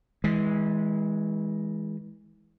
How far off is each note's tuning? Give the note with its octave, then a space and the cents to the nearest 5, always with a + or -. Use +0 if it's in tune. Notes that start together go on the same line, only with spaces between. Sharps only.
E3 -30 G#3 +0